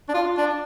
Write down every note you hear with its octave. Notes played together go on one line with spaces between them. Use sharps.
D4
F4
D4